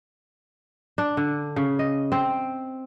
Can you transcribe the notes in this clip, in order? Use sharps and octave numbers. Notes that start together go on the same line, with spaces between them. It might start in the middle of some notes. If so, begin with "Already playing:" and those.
D4
D3
C#3
D#5
C4